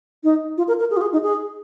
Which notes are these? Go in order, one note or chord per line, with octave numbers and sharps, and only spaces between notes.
D#4
F4
A#4
A#4
G#4
F4
G#4
D#4
G#4